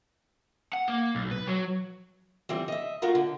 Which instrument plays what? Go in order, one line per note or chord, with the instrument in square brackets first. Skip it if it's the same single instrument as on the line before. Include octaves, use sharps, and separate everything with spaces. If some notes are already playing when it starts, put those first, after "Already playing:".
[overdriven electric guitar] F#5
A#3
B1
B4
F#3
[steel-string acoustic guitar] E3 G3 C4
D#5 E5
A3 F4 F#4 A#4
D3